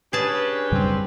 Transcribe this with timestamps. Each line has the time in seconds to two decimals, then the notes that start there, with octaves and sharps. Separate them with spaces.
0.13 C#4 D4 G4 G#4 B4 A5
0.72 F#2 C#3 G3 C4